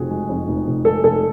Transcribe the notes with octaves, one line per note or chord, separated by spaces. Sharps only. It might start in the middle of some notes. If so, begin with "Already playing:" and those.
Already playing: F1 F2 F3 F#4 G#4
G#3
F2
F1
F1
G#3 A4
F1 A4